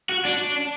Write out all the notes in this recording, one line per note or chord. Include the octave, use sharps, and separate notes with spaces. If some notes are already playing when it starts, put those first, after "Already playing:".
F#4
D4